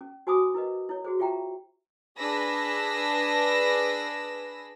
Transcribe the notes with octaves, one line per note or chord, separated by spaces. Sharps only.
C#4
F#4 C5 G#5 B5 D6 D#6
E4 A#4 B4 D#5
E4 C#5
F#4 G#4 C5
F4 G4 E5 G5 A#5
D4 G#4 B4 E6 A#6